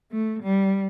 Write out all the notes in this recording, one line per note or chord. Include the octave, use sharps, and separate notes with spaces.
A3
G3